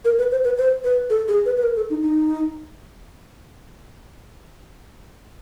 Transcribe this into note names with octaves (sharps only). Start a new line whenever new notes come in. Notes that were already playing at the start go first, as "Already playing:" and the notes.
A#4
B4
C5
B4
C5
B4
A4
G#4
B4
B4
A#4
A4
D#4
D#4